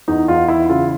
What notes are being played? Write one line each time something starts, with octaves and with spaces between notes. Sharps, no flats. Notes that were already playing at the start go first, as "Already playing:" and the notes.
E2 D#4
E2 F4
E3 E4
C#3 F4